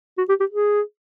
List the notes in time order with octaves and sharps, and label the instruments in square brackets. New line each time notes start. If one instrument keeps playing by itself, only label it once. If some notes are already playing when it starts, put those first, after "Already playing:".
[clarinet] F#4
G4
G4
G#4